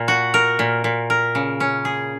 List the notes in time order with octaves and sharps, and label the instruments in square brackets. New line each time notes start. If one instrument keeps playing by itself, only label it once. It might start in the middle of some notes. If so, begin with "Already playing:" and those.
Already playing: [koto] A#2
F#4
A#4
A#2
A#2
A#4
C#3
C#4
G#4